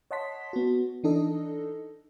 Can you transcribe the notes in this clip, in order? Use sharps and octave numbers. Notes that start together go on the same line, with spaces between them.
C#5 D#5 F#5 A5 C6 B6
B3 F#4
E3 D4 D#4 A4 D#5